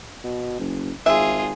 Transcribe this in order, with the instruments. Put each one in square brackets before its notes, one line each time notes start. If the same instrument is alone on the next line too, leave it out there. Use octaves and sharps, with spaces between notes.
[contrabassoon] B2
F#1
[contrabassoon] G#1 [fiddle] F4 G#4 [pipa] E5